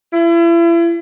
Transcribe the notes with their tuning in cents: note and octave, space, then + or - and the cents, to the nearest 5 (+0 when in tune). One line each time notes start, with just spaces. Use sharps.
E4 +35